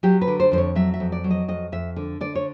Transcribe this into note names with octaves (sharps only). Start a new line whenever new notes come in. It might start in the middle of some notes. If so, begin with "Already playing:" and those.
F#3 G4
B4
D3
C5
F2 C5
C#5
F#3 E5
E5
F2
D5
F#3
D#5
F2 D#5
F2 E5
D3
D3 D5
C#5